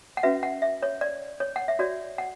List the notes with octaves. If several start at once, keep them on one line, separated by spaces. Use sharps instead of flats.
F#5
C#4 F#4 B4 E5
F#5
E5
C#5
D5
C#5
F#5
E5
F#4 C#5 D5
F#5